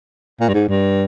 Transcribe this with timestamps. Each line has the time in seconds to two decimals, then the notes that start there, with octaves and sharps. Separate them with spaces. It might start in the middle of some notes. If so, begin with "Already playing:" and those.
0.40 A#2
0.49 G2
0.54 G#2
0.68 G2